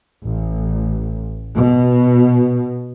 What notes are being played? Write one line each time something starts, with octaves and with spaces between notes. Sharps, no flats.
A1
B2